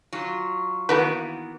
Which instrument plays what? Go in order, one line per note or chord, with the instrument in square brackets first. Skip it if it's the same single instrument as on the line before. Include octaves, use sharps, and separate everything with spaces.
[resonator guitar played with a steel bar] F#3 F4
[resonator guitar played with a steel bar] D#3 E3 B3 [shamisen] A#3 F#4 B4